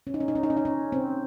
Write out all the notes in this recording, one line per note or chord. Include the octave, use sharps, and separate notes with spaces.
C#4
D#4
C#4
D#4
C#4
D#4
C#4
D#4
C#4
C4